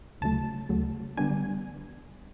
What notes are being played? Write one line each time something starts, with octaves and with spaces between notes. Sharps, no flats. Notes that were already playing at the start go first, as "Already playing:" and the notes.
D2 C#3 F#3 A3 A5
D2 C#3 F#3 A3
D3 G3 B3 D4 G#5